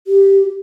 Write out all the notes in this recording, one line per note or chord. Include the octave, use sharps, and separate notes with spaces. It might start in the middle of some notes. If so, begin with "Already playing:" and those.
G4